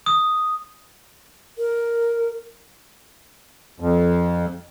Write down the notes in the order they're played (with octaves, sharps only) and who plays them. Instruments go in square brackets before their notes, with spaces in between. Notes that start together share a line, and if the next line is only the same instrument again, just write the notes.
[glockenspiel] D#6
[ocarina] A#4
[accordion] F2